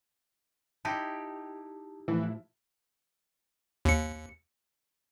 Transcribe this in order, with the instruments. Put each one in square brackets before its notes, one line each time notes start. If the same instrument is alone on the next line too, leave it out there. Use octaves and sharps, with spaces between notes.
[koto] D#4 E4 G4 [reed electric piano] A5
[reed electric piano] A2 [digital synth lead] E3 [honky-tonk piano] F3 E4
[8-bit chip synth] D#2 C#7